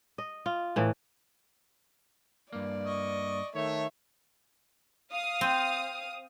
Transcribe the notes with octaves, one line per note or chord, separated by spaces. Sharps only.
D#5
F4
A2 E3
G2 A#3 D5
D#5 C#6
D#3 A3 C#5 E5
F5 D#6
C4